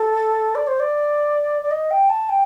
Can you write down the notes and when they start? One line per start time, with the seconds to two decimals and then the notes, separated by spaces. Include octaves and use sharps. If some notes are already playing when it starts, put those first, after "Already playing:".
Already playing: A4
0.55 D5
0.68 C5
0.80 D5
1.63 D5
1.71 D#5
1.91 G5
2.10 A5
2.29 G5